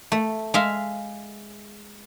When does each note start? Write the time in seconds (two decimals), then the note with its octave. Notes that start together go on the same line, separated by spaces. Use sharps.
0.12 A3
0.54 G#3 E5 F5